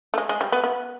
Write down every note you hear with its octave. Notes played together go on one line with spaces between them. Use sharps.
A3
G#3
G#3
G3
B3
B3